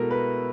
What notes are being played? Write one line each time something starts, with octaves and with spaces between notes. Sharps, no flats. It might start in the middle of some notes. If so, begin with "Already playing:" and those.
Already playing: B2 G#3 E4 A4 A#4
B4